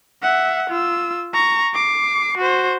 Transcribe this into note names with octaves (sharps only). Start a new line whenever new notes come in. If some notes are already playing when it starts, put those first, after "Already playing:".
E5 F#5
F4 E6
A#5 C#6
D6 C7
F#4 C5